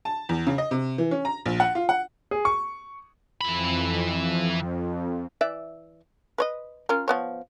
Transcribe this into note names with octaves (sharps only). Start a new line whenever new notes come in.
A5
E2
C#3
D#5
C3
E3
C#4
A#5
A#1
F#5
F4
F#5
G#4
C#6
F2 E3 B5
E3 D5 E5
B4 C#5 D#5
C#4 F4 A#4
F3 B3 C#5